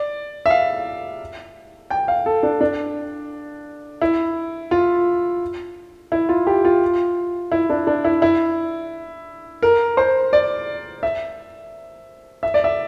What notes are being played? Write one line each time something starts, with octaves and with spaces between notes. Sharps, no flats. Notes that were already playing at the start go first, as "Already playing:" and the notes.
Already playing: D5
E5
F5
G5
F5
A4
D4
D4
E4
F4
E4
F4
G4
F4
E4
D4
D4
E4
E4
A#4
C5
D5
E5
E5
D5
E5